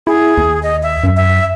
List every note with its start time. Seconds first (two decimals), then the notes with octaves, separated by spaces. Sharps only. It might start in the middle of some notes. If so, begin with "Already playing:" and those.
0.07 E4 G#4
0.38 D#2
0.63 D#5
0.83 E5
1.04 F#2
1.16 E5